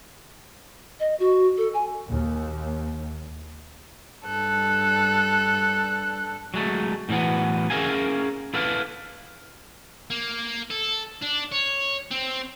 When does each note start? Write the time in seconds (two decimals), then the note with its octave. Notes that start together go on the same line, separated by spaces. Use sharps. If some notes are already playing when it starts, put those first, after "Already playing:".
1.00 D#5
1.20 F#4
1.58 A4
1.74 G#5
2.08 D#2
4.26 G2 A4 F#6
6.54 F#3 G#3 A3
7.09 A2 D3 E3 F#3 B3
7.70 C#4 G#4 A#4 E5 F5 G#5
8.54 E4 A4 B4 F5
10.10 A#3
10.71 A4
11.23 D4
11.52 C#5
12.11 C4